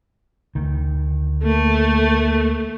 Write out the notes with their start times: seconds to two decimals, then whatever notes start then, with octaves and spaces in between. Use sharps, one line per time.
0.55 D2 D#3
1.44 A3 A#3